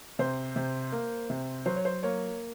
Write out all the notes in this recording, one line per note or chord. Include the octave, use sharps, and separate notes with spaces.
C3 C5
C3
A#3
C3
F#3 C5
C#5
C5
A#3 C#5